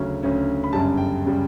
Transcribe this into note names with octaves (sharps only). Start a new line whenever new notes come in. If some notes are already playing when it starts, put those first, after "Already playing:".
Already playing: D2 C#3 F#3 C#4
D2 C#3 F#3 C#4
B5
G1 F#2 C#3 G3 A5
G5
C#3 G3